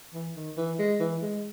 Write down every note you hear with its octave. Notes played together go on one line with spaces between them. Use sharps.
E3
D#3
E3
G#3
E3
G#3